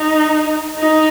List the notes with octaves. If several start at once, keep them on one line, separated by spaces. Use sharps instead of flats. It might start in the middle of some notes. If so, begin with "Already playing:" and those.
Already playing: D#4
D#4